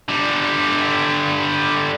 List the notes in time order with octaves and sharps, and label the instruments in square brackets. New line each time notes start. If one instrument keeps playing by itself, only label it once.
[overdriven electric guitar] D3 G3